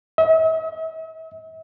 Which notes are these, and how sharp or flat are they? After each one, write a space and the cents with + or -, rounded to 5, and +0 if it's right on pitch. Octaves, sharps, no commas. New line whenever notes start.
E5 -45